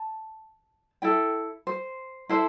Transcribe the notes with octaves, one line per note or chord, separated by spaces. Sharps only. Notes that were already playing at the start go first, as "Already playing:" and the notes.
Already playing: A5
E4 A4 G5
C5
E4 A4 C5